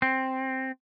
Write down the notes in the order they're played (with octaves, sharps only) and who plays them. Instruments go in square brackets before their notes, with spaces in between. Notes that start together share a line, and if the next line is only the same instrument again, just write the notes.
[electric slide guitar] C4